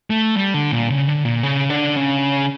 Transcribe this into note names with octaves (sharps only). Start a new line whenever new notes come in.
A3
G3
D3
A#2
C#3
D3
A#2
C#3
D3
C#3